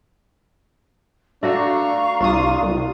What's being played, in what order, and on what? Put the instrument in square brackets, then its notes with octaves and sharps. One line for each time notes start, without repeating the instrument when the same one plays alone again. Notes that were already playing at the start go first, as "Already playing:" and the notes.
[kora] A3 F#4 [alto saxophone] D4 [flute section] F5 A#5 C#6
[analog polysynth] C2 D#6 [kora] D4 [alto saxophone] F4
[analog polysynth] C2